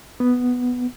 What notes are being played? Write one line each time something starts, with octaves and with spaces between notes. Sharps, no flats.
B3